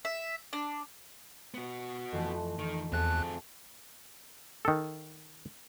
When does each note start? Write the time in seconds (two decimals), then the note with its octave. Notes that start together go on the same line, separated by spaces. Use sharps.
0.05 E5
0.53 D4
1.54 B3 F#4
2.12 F2 E3 A3
2.59 F2 D#3
2.92 E2 C4 G#4 F5 A5 F#6
4.65 D#3 A4